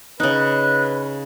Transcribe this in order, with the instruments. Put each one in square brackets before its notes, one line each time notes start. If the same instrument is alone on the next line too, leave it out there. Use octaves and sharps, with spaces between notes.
[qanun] C#3 D#4 [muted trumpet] B4 [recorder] F#6